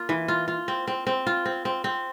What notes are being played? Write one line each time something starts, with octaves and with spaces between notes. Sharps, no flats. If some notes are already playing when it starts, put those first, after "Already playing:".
Already playing: A#3 F4
E3
F4
F4
C4
C4
C4
F4
C4
C4
C4